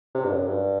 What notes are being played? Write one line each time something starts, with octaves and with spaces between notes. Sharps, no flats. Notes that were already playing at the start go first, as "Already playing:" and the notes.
C3
G2
F#2
G2